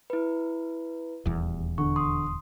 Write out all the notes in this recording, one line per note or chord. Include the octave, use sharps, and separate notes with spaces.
E4 B4
D#1 E2
D3 C#6
C6 D#6